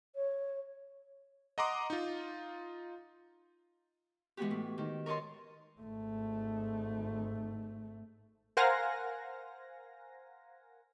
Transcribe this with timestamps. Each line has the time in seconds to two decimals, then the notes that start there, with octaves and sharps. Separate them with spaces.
0.16 C#5
1.58 D#5 F#5 A#5 C6 D6 D#6
1.90 D#4 F4
4.37 E3 G#3 B3 F#4 G4
4.51 A2
4.78 D#3
5.06 A#4 C#5 D#5 A5 C6
5.81 G#1 A3
8.57 A#4 C5 F5 F#5 G#5 A#6